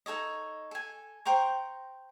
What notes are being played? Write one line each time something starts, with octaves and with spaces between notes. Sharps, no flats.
D#4 A4 C#5 D#5
A4 G#5
C5 G5 A#5 C#6